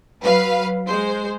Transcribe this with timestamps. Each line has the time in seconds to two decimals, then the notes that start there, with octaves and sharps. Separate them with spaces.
0.22 F#3 B4 F5
0.87 G#3 C5